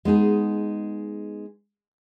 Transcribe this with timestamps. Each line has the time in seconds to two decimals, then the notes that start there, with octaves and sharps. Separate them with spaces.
0.05 G#3 B3 D#4 G#4